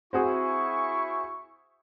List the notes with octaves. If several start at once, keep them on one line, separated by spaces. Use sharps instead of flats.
C4 E4 F#4 G#4 C#6